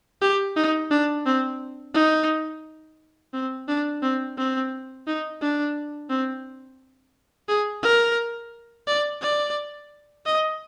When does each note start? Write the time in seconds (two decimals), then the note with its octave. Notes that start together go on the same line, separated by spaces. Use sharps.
0.22 G4
0.56 D#4
0.91 D4
1.26 C4
1.94 D#4
3.33 C4
3.68 D4
4.02 C4
4.38 C4
5.07 D#4
5.41 D4
6.10 C4
7.48 G#4
7.83 A#4
8.87 D5
9.21 D5
10.26 D#5